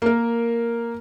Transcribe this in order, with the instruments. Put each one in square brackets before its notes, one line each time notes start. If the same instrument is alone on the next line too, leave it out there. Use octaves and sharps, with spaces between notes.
[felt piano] A#3 A#4